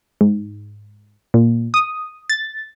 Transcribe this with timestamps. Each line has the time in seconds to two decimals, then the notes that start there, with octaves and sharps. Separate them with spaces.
0.21 G#2
1.34 A#2
1.74 D#6
2.30 A6